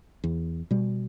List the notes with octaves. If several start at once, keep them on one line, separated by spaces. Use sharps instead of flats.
E2
B2 G3